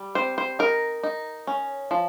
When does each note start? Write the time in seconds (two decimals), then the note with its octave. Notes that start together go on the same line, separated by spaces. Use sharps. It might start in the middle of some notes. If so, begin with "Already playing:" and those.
Already playing: G3
0.15 C4 C5
0.38 C5
0.59 D#4 A#4
1.03 D#4
1.47 C#4
1.91 F3